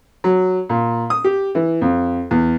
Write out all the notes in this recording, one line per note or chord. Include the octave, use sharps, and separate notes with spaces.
F#3
A#2
D#6
G4
E3
F2
E2